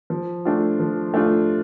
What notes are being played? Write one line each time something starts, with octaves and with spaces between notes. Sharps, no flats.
F3
A3 D4 F4
F3
A3 D4 F4